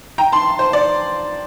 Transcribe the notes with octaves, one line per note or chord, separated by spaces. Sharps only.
G5 A#5
A5 C6
C5
D5